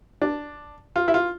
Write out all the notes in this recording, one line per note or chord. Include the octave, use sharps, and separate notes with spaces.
D4
F4
E4
F4